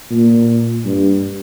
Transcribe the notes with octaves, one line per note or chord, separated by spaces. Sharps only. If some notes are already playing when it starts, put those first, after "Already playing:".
A#2
G2